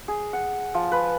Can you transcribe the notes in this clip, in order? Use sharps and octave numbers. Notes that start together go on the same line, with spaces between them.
G#4
F#5
F3
B4